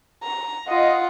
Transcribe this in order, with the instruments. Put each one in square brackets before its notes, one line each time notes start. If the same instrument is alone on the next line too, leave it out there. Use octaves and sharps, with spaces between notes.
[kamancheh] A#5
[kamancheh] F4 F#5 [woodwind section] D#5